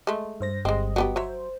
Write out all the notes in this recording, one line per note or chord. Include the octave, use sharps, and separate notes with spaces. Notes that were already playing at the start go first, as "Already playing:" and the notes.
G#3 A3
G2 C5 A#6
G1 G3 G#3 C4 D#5
F#3 B3 G4
F#3 C5 C#5 E5